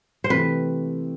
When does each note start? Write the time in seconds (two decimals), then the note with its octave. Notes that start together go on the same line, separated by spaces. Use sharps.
0.24 C5
0.30 C3 E3 A3 C4 B4